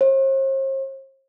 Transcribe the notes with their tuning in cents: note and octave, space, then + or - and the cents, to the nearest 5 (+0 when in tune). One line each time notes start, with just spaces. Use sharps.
C5 +45